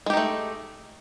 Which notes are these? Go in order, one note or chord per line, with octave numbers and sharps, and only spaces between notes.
G#3 A3 D#4 G4